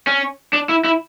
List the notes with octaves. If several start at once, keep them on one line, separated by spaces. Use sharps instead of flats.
C#4
D4
E4
E4